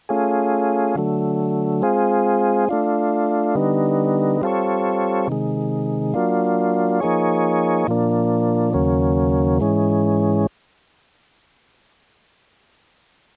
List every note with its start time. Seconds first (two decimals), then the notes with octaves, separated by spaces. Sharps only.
0.09 A3 C#4 F4 G#4
0.95 D3 F#3 A3
1.82 G#3 C4 F4 G#4
2.69 A3 D4 F4
3.55 D3 G3 B3 D#4
4.42 G3 C4 F4 A4 C#5
5.28 C3 D#3 G#3
6.14 F#3 A#3 D4 F4
7.00 F3 A#3 D#4 G#4 C#5
7.87 A#2 F3 A#3 D4
8.74 D#2 C#3 F#3 A#3 C#4
9.60 G#2 E3 G#3 C#4